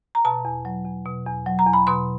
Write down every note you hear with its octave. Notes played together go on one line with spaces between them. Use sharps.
A#5
B2 A5
E2
F#3
E2
B2
E2
F#3
A#5
E2
B5
B2 C6